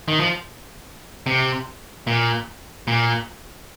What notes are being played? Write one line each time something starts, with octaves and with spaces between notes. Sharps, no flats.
D#3
F3
C3
A#2
A#2